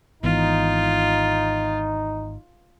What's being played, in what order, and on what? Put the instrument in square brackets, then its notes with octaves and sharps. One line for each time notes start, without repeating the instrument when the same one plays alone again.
[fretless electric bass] G#1 E3 B3 [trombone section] D#4 [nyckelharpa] F4